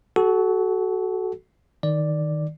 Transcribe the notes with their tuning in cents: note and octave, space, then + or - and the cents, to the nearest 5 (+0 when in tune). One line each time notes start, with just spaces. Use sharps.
F#4 +15 A4 -25
D#3 -5 D5 +0